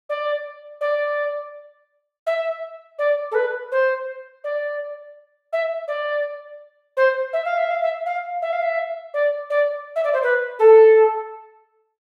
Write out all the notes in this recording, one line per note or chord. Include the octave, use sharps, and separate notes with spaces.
D5
D5
E5
D5
A4
B4
C5
D5
E5
D5
C5
E5
F5
E5
F5
E5
F5
E5
F5
E5
D5
D5
E5
D5
C5
B4
A4